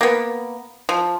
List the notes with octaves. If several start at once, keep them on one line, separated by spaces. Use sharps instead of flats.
A#3 B3
F3